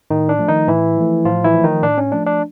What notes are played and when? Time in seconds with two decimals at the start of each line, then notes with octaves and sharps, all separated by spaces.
0.11 A2 D#3 D#4
0.29 D4
0.39 F3 A3
0.49 D#3 D#4
0.68 A2 E3 E4
0.97 F3 A3
1.25 A2 F3 F4
1.44 E3 E4
1.54 F3 A3
1.64 D#3 D#4
1.83 A2 D4
1.98 C#4
2.12 F3 A3 D4
2.26 D4